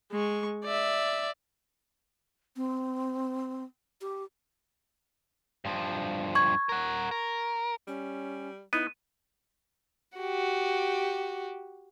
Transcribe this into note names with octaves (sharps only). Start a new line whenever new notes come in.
G#3 C#6
D5 E5
C4
G4
G2 F3
C#6 G#6
A#4 F#5
A#4
G3 C#4
B3 D#4 E4 D#7
F#4 G4